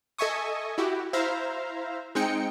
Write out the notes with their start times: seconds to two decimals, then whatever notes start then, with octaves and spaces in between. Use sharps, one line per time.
0.18 A4 D#5 E5 G#5 C#6 D#6
0.78 E4 F#4 G4
1.13 E4 C5 E5 F5 A#5
2.15 G#3 C4 D#4 G5 C#7